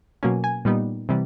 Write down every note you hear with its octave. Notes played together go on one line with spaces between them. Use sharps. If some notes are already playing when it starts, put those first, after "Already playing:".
B2 F#3 A#3 C#4 G#5
G#5
A#2 G3 B3 D#4
C3 E3 G3